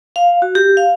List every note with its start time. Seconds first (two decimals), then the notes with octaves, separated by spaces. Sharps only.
0.16 F5
0.42 F#4
0.55 G4
0.77 F5